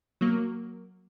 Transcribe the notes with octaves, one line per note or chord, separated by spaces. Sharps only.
F#3 A#3